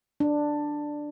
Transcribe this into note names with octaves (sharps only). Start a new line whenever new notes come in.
D4